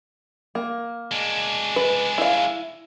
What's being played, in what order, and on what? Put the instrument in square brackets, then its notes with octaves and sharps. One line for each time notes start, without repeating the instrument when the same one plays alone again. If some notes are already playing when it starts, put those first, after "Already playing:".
[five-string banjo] A#3
[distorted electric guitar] G#3 D4
[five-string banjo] B4
E4 F5